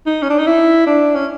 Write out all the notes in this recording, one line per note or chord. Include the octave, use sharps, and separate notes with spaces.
D#4
C#4
D4
D#4
E4
D4
C#4